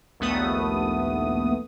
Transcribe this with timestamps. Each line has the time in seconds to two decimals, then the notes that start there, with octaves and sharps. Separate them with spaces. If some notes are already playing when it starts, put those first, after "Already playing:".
0.20 A#1 D#2 A3 B3 D#6